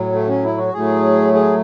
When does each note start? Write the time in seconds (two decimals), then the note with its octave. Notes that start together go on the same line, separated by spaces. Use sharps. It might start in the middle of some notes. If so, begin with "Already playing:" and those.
Already playing: A2 F#3
0.13 A3
0.28 C#4
0.43 E4
0.58 F#4
0.73 A2 F#3 A3 G#4
1.34 G#4